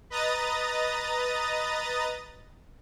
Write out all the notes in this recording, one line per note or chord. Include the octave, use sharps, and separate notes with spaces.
B4 D#5 A#5 D#6 A6